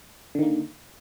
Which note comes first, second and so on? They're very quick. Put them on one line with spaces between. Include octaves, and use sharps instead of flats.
D3 D#3 A#3